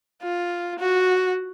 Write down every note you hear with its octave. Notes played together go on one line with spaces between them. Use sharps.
F4
F#4